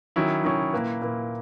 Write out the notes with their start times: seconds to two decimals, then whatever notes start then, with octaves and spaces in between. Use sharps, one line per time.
0.16 D#3 F#3 C#4 E4
0.44 D#3 F#3 C#4 E4
0.73 A#2 A#3 E4 B4
1.01 A#2 A#3 E4 B4